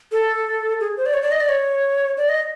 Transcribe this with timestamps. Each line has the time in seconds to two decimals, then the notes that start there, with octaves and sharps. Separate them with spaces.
0.12 A4
0.80 G#4
0.97 C5
1.06 D5
1.14 C#5
1.22 D5
1.31 D#5
1.40 D5
1.49 C#5
2.17 D5
2.29 D#5